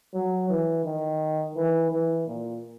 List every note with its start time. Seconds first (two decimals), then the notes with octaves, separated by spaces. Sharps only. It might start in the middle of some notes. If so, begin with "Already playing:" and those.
0.14 F#3
0.49 E3
0.85 D#3
1.55 E3
1.91 E3
2.26 A#2